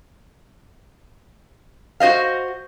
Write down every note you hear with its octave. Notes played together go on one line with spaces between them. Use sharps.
F#4 C5 D#5 F5